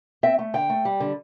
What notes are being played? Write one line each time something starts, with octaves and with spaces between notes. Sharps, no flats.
C4 E5
A3
D3 G5
A3
G3
D3